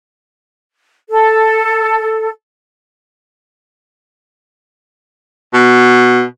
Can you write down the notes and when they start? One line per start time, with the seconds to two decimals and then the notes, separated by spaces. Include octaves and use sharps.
1.10 A4
5.54 B2